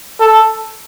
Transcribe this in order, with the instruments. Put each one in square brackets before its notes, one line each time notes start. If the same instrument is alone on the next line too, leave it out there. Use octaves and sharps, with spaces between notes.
[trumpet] A4